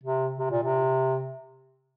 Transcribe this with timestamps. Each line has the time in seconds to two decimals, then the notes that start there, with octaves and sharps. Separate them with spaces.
0.04 C3
0.38 C3
0.51 A#2
0.63 C3